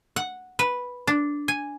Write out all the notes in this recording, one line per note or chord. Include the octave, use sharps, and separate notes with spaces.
F#5
B4
D4
G#5